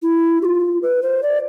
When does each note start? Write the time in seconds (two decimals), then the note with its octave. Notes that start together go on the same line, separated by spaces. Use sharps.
0.03 E4
0.42 G4
0.45 F4
0.82 B4
1.03 C5
1.23 D5